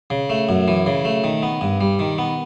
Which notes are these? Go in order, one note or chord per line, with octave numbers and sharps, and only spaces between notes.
C#3
A3
F#2
E3
C#3
A3
D#3
B3
G2
G3
D#3
B3